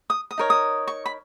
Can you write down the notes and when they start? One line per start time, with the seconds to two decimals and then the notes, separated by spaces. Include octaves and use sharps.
0.10 D#6
0.31 D#6
0.38 D#4 A#4 C#5
0.50 D#6
0.87 C#6
1.06 B5